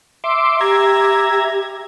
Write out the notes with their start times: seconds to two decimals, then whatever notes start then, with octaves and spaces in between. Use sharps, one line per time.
0.24 E5 C6 D6
0.61 G4 E5 A#5 G#6